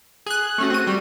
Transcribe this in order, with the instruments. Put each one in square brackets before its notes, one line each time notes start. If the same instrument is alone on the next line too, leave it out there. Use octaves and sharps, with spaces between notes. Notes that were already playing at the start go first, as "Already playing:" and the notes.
[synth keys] G#4 F#6
[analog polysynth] A3 C#4 F#4
[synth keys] C4 D#7 [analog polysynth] F#4
[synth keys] G3